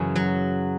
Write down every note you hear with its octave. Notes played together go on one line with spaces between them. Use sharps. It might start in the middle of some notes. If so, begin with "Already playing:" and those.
Already playing: F#2 C#3 E3
F#3